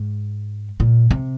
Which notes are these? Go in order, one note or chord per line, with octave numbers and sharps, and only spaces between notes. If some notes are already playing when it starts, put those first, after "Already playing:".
Already playing: G#2
A#2
C3